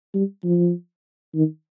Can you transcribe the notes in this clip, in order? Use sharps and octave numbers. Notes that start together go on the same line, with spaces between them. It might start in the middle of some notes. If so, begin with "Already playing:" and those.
G3
F3
D#3